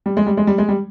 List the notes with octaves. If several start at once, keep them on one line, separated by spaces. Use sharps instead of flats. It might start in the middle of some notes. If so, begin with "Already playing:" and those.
G3
G#3
G3
G#3
G3
G#3
G3